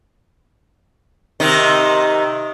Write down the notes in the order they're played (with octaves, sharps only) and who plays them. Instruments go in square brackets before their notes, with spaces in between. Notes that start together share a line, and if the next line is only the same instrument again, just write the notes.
[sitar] C3 D#3 D#4